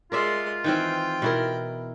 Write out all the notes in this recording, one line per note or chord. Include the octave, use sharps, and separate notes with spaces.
G#3 F4 A#4 D5 E5 C6
D#3 E3 C4 G5
B2 E4 A#4